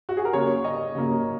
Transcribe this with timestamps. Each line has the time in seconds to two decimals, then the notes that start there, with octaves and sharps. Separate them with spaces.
0.09 F#4
0.17 G#4
0.25 A#4
0.33 C#3 F#3 A#3 C#5
0.64 D#5
0.95 C#3 F#3 A#3